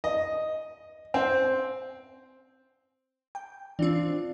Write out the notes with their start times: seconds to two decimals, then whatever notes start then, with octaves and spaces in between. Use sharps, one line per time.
0.04 D#5
1.14 C4
3.35 G5
3.79 E3 C4 D4 F4